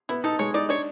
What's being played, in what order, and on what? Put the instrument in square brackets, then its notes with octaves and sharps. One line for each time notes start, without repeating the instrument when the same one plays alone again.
[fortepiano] B3 [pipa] E4
[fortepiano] D#4 [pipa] A4
[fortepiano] G#3 [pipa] C#5
[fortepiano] D#4 [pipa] D5
[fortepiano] D4 [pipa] C#5